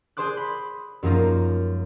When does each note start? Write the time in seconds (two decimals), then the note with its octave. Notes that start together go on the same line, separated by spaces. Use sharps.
0.17 G#4 C5 C6 D6 F#6
0.37 B5
1.03 F#2 F3 G#3 A#3 D#4 F4